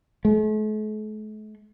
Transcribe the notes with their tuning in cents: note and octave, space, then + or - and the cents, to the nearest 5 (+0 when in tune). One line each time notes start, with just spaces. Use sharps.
A3 -45